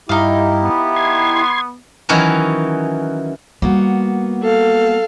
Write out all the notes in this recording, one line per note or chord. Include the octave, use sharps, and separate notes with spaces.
G2 D#4 E4 G4 F5
B3
C6 G#6
D#3 E3 F#3 C#4 D#4 E4
G3 A#3 B3 F#4
A4 F5